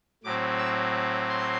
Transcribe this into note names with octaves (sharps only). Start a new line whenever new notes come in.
A2 F#3 C4 D6
E6
C6